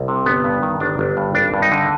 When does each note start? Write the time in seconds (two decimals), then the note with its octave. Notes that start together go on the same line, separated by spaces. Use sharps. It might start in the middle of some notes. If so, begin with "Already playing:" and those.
Already playing: C2
0.08 C3
0.26 G1 B3
0.44 G2
0.63 D#3
0.80 G1 D4
0.99 G1
1.17 G2
1.35 G#1 D4
1.54 G2
1.62 D#4
1.72 D3